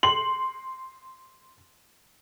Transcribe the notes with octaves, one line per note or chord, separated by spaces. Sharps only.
C6 F#7